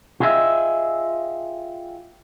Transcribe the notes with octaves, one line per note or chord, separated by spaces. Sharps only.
F4 G4 G#4 D#5 E5